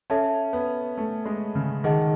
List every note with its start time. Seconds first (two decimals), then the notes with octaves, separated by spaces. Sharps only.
0.10 C#4 A4 C#5 E5 A5
0.53 B3
0.97 A3
1.25 G#3
1.55 C#3
1.84 D#3 D#4 G#4 D#5 F#5 A5